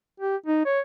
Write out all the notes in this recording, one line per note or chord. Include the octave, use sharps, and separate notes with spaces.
G4
D#4
C#5